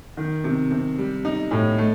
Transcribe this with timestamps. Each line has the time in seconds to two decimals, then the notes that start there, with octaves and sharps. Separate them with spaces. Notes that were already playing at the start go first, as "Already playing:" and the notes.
0.17 D#3
0.44 C3
0.71 C3
0.98 G3
1.25 D#4
1.51 A2
1.78 A3